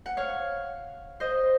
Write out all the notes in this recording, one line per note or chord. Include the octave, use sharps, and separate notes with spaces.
F#5
C#5 F5
C5 D#5